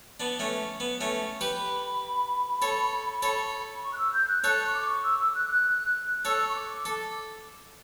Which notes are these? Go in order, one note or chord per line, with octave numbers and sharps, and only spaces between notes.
B3 D4
A3 C#4
B3
A3 C#4
G4 B4 B5
A4 C#5
A4 C#5
C#6
F#6
E6
G6
F#6
A4 C#5 F#6
C#6
D6
C#6
E6
E6
F#6
F#6
A4 C#5 E6
C#6
D6
A4